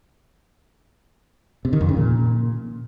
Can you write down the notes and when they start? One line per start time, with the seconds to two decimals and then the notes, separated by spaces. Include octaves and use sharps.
1.65 C3
1.73 D#3
1.81 F2
1.89 C#3
1.97 A#2